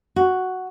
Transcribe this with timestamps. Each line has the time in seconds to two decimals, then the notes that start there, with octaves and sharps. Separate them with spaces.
0.16 F#4